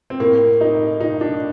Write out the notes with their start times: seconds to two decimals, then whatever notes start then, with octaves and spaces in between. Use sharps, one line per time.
0.10 C4
0.20 A2 A#3
0.61 D#4
1.00 A2 D#4
1.21 D4